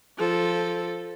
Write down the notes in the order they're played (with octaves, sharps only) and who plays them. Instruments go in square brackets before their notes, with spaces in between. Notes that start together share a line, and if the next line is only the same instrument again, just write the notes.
[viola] F3 A4